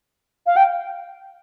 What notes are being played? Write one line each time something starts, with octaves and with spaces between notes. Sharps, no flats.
F5
G5